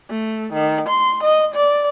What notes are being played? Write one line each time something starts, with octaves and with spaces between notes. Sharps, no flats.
A3
D#3
C6
D#5
D5